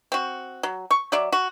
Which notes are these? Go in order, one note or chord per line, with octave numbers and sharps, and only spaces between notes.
C4 F#4
F#3
C#6
F#3 D5 E5
F#4